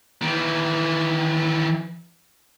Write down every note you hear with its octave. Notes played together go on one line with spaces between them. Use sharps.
D#3 E3